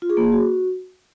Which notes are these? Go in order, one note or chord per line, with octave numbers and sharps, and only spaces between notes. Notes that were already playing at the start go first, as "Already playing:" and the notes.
F4
G#4
A#3
G#4
F#4